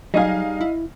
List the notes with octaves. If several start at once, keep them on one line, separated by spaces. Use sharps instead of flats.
F#3 G3 D#4 G#4 D#5 F5
E4